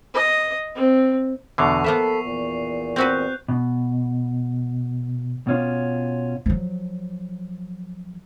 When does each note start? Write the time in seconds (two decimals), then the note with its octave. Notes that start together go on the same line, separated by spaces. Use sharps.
0.14 D#5
0.75 C4
1.58 E2 B2 D3 C#6 C7 F7
1.84 F3 A#3 B3 A4 E5 B5
2.24 E2 A#2
2.96 C4 F#4 B4 F#6 G6
3.48 B2
5.47 B2 C#4 F4
6.46 F3 F#3